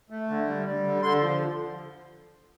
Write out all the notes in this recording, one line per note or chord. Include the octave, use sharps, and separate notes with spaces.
A3
D3
G3
G3
D3
D3 C6
F3